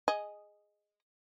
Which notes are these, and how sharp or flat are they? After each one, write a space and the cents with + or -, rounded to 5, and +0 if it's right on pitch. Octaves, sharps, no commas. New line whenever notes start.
G#4 +0 D#5 -5